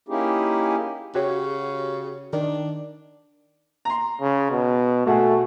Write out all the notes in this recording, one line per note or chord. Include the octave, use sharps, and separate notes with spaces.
A#3 C#4 D#4 E4 G4 G#4
C#3 F#4 G4 C#5
D#3 D4
A#5 C6
C#3
B2
B2 A3 F#4 G#4